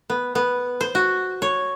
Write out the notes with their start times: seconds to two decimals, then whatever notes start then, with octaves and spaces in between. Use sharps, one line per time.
0.10 B3
0.35 B3
0.81 C5
0.95 F#4
1.42 C#5